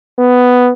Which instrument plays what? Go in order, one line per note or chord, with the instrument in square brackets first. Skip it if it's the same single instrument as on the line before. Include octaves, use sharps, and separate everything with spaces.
[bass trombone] B3